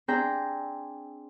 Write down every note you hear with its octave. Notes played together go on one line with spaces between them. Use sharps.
C4 D4 G#4 G5 A#5